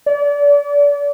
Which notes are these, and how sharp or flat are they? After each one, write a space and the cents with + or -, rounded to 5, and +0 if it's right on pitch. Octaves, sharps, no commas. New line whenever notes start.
D5 -35